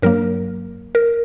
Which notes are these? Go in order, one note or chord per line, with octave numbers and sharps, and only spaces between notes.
G2 F#3 A#3 A#4
A#4